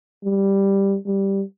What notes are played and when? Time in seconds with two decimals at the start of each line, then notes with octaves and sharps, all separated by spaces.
0.24 G3
1.06 G3